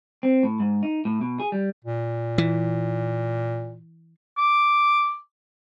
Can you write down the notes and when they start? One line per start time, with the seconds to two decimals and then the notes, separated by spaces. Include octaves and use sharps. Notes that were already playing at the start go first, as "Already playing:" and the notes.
0.23 C4
0.43 A2
0.60 G#2
0.83 D#4
1.05 A2
1.21 B2
1.40 G#4
1.52 G3
1.85 A#2
2.38 E3
4.38 D6